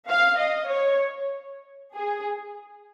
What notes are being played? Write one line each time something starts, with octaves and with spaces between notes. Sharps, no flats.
F5
D#5
C#5
G#4